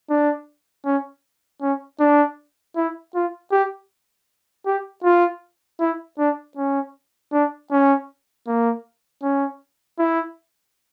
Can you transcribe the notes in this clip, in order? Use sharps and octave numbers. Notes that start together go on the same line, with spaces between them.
D4
C#4
C#4
D4
E4
F4
G4
G4
F4
E4
D4
C#4
D4
C#4
A#3
C#4
E4